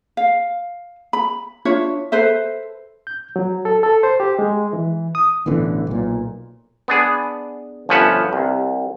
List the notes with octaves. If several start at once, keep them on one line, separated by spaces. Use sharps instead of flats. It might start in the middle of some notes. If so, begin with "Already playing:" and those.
F5
B5
D4 F4 C#5 E5
A4 B4 C5 E5
G6
F#3
A4
A4
C5
G4
G#3
E3
D#6
A1 B2 D3 E3
B1 A#2
B3 D4 G#4
G1 F3 C#4 B4 E5 F#5
C2